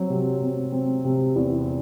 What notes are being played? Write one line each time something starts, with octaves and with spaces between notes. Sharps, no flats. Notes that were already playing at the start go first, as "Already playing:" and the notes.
Already playing: F#3 C4
C3
C4
C4
C3
E2